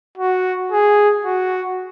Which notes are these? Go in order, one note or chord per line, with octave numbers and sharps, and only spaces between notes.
F#4
G#4
F#4